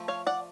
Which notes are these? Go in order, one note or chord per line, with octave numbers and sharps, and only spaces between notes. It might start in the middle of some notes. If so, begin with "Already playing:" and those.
Already playing: F3 A3
C#5 F5
D5 F#5